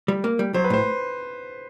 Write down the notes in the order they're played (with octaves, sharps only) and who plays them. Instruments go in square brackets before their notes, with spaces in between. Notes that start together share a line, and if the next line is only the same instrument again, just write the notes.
[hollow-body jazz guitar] G3
A#3
G3
[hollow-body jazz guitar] F#3 [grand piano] C5
[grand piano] B4
[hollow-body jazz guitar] A2 [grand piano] C5